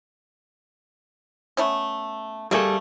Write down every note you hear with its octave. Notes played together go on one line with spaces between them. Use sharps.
A3 B3 C#4
G3 A3 A#3 G#4 A4